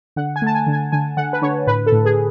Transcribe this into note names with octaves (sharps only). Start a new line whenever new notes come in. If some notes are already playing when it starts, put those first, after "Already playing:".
D3 F#5
G#5
A3 A5
G#5
D3
G#5
D3 G#5
D3 F#5
B4
D3 C#5
A2 B4
A4
A2
G#4